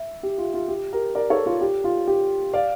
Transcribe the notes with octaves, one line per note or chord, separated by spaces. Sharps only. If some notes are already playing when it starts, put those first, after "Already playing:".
Already playing: E5
G4
F4
F4
G4
G4 A#4
A#4 D5
A4 C#5
F4 A4
G4
F4
G4
D5 F5